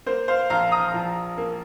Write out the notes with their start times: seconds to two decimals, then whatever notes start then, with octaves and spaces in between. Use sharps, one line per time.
0.06 A#3 C5
0.28 C5 F5
0.50 A#1 F5 A#5
0.72 A#5 D#6
0.94 F3
1.38 A#3